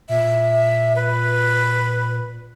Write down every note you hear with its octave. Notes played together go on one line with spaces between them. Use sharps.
A#2 E5
B4